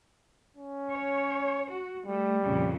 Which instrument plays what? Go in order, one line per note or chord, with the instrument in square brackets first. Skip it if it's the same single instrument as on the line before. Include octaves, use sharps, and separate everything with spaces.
[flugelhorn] C#4
[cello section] C#5
F#4
[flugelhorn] G3 [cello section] A3
[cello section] F2 A#2 C#3